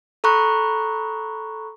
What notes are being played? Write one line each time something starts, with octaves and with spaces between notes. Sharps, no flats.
A4 A#5 B5 C#6 F#6